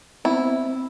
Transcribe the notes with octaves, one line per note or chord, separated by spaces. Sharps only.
B3 C4 E4